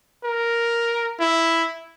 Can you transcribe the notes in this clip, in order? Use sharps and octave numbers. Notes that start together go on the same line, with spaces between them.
A#4
E4